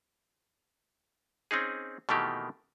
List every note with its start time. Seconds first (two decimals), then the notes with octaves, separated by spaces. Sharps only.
1.51 C4 C#4 D#4 G#4
2.09 B2 D#3 E3 A3 A#3 G4